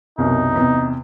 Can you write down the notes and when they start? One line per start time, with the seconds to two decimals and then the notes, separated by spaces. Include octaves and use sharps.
0.18 C2 F#2 B2 D#4
0.56 E2 C3